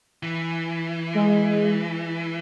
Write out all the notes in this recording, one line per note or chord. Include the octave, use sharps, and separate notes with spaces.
E3
G#3